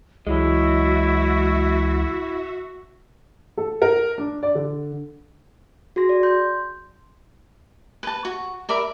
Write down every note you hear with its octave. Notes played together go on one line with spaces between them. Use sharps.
C#2 E3 F#3 G#3 E4 F#4 E5
A4
A#4
D4
D5
D3
F#4 G#4 C6 A#6
D5
C6 G6
B4 A5
F#4
A#4 D5 E5 B5